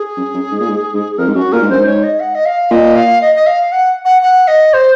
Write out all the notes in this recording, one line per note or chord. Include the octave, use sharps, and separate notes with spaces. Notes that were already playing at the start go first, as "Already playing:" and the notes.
Already playing: G#4
F#2
F#2
G#2
A#2
G#2
G#2
F2 A#4
G#2
F#2 F#4
A#2 A#4
G#2
F#2 C5
G#2
C#5
D#5
F#5
D#5
F5
A#2 D#5
F5
D#5
D#5
F5
F#5
F#5
F#5
D#5
C5